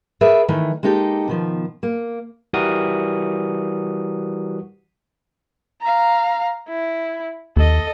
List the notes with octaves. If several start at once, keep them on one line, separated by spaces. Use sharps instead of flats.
G#4 A#4 B4 D5 E5
D#3 E3 A3
G#3 A#3 D#4 G4 A4
B2 D#3 F3
A#3
E3 G3 F#4 A#4 D#6
F5 A#5
E4
D#2 A4 D#5